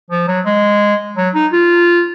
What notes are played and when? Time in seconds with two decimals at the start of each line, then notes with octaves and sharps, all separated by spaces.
0.10 F3
0.28 F#3
0.45 G#3
1.17 F#3
1.35 D#4
1.53 F4